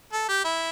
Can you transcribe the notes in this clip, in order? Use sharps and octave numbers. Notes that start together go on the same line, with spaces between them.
A4
G4
E4